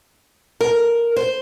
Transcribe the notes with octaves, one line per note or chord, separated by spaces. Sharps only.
A#4
C5